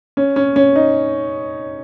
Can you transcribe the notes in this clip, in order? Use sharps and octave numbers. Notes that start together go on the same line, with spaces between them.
C#4
C#4
C#4
D#4